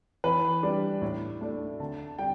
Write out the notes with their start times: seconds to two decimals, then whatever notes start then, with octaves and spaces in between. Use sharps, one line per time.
0.24 E3 B4
0.63 G3 D4
1.02 A2
1.41 A3 D4
1.80 D3 A5
2.19 G3 D4 G5